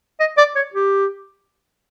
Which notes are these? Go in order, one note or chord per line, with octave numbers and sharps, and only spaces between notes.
D#5
D5
C#5
G4